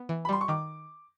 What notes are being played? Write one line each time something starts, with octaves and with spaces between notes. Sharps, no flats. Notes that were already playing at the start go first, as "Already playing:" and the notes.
Already playing: B3
E3
B5
G3 C6
C#6
D#3 D6